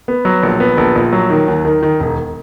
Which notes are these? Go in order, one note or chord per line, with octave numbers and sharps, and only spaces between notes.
B3
F#3
A#1
B3
A#1
A#1
F#3
D#3
D#2
D#3
D#3
E1